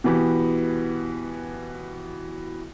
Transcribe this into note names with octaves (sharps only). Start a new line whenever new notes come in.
B2 E3 B3 G4